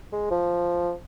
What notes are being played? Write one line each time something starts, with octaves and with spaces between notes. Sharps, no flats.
G#3
F3